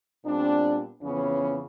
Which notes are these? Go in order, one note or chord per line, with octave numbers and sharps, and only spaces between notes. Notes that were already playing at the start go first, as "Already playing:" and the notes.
A#2 G3 B3 C4 D4
F2 C#3 E3 B3 C#4